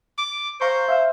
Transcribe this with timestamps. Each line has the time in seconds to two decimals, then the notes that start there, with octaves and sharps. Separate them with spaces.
0.18 D6
0.61 C5 F5 A#5 C#6
0.88 E5 F5 E6